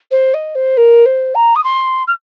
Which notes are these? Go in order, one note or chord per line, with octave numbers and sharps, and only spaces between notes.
C5
D#5
C5
A#4
C5
A#5
D#6
C6
F6